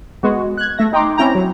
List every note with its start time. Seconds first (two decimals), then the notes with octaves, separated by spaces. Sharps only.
0.23 G#3 B3 F#4
0.58 F#6 G#6
0.78 A3 E5 A#6
0.92 D#4 G5 A#5 C6 D6
1.18 C4 C#4 E4 G5 A#5
1.35 F#3